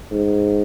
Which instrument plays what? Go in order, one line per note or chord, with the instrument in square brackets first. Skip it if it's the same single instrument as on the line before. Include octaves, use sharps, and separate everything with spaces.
[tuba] G#2